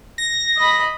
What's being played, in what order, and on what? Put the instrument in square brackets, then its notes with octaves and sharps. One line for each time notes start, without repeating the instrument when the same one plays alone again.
[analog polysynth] A#6
[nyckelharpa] D#5 B5